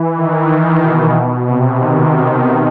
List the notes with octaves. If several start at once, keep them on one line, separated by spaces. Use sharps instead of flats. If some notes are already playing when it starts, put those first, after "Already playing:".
Already playing: E3
D#3
B2
B2
C3
D#3